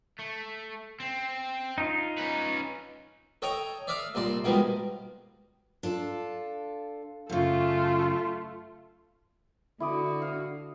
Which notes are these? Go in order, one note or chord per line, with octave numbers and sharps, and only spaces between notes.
A3
C4
D#4 F4
C#4 B4
A4 C#5 D#5 G5 A#5 D#6
D5 E5 F5 D6 D#6
C2 A#2 D5 A5 C6
B2 D#3 F3 G3 G#3 B3
D4 F4 A4
F#2 C#3 A3 F4
D3 E4 F#4 D6 D#6
F5 D#6